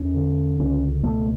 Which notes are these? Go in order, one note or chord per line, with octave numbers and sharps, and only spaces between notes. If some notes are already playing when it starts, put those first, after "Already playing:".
Already playing: E2 C#4
D3
C#2 C#4
B2 A3